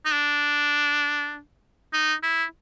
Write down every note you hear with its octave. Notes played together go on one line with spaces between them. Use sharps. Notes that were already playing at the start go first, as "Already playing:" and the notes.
D#4
D4
D#4
E4